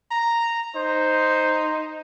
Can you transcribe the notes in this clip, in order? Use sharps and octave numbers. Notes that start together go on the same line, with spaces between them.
A#5
D#4 C5